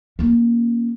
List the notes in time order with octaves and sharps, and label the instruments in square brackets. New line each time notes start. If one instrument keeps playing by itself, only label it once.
[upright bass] A#3 C#4